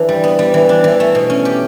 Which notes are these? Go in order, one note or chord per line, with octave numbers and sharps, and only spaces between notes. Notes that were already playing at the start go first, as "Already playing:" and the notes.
Already playing: E3 D4
G3
B3
G3
E3
D4
E3
A3
B2
C#4
G4